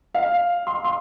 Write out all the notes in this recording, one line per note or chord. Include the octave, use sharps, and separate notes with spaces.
F5
C6
C6